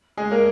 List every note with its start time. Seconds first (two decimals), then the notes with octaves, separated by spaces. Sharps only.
0.17 G#3 G#4
0.31 A#3 A#4